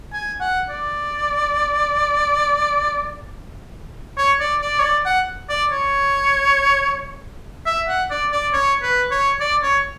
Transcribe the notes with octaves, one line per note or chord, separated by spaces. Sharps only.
G#5
F#5
D5
C#5
D5
D5
C#5
D5
F#5
D5
C#5
E5
F#5
D5
D5
C#5
B4
C#5
D5
C#5